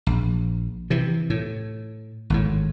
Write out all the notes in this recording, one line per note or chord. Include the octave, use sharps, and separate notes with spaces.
A#1
C3 E3
A2
G#1 A2